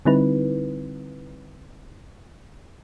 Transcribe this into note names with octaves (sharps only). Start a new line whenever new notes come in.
D3 G3 C4 D#4 E4 B4